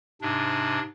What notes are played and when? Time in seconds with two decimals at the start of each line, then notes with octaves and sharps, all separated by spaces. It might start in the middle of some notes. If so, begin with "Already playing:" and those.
0.22 G#2 C3 D4